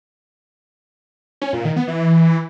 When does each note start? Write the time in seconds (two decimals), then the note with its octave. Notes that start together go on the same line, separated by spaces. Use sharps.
1.42 C#4
1.53 A#2
1.65 D#3
1.76 B3
1.88 E3